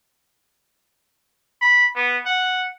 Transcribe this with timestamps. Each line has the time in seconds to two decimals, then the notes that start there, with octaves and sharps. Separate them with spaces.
1.62 B5
1.95 B3
2.26 F#5